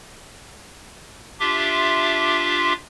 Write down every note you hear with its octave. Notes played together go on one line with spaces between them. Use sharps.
D4 F4 G4 E5 C6 D6